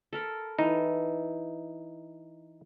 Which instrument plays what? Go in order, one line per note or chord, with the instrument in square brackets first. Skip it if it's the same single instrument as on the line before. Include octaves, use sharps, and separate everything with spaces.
[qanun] A4 A#4 B5
[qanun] E3 [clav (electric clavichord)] D#4